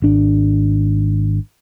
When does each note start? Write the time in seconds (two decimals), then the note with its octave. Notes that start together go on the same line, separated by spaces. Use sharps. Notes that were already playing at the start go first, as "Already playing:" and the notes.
0.02 G#1 D4